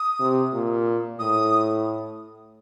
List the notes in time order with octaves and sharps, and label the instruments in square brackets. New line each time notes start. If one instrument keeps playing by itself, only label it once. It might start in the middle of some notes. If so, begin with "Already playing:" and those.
Already playing: [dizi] D#6
[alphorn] C3
A#2
[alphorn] A2 [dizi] D#6